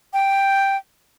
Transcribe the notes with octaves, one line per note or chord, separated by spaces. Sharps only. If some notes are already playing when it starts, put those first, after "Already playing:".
G5